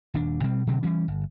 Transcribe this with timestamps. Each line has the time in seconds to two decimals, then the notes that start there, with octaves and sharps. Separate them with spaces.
0.14 D#1 D#2 D4
0.43 B2 G3 C4
0.67 B2 D3 F#3 C4
0.83 E3 G3 C#4
1.08 G1